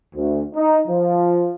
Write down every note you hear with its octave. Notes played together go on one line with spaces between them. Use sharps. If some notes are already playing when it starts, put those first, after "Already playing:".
D2
D#4
F3